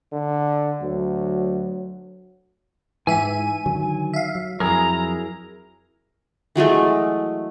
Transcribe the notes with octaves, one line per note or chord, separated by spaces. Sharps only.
D3
D2 F#3
G#2 E3 E5 G#5 D#7
D3 D#3 F#3
E5 F5
F#3
F2 F#3 E4 G#4 A#4 A#5
E3 F#3 G#3 A3